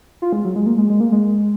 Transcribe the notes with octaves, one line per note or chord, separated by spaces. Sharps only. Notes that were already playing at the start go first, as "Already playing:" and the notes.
F4
G#3
F#3
G#3
A#3
G#3
G#3
A#3
G#3